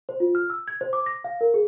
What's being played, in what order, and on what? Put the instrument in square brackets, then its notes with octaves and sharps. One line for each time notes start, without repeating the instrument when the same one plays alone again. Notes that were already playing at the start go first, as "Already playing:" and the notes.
[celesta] C5
F4
F6
E6
G#6
C5
D6
A#6
F5
A#4
G#4